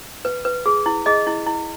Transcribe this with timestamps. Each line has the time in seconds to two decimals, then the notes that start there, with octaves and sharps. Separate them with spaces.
0.25 B4
0.45 B4
0.66 G#4
0.86 E4
1.06 G#4 D#5
1.27 E4
1.47 E4